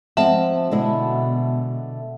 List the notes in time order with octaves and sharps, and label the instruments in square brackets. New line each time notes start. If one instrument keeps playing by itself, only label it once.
[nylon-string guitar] F3 G#3 C4 [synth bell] E5 F#5 A5
[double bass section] B2 [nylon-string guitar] D3 G#3 E4